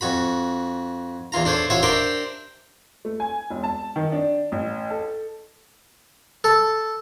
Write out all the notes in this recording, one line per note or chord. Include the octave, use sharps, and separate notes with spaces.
F2 F#4 B5
E2 E3 F4 A#5
D4 A4 C5 C#5
A1 F4 C#5 E5 F#5
D4 G4 A#4 C5 E5 G5
A3
G#5
E1
A5
D#3
D4
A1
A4
A4